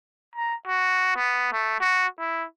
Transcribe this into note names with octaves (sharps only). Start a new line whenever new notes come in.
A#5
F#4
B3
A3
F#4
E4